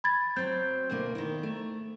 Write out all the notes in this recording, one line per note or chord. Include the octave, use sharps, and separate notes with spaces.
B5 G#6 A6
F#3 C4 G6
D2 B2 A#3
D#3 E4
A3